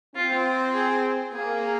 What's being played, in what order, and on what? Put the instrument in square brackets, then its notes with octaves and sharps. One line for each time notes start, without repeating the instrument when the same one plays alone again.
[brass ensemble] C4 [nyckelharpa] F4
[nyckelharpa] G#4
[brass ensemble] A#3 [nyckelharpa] G#4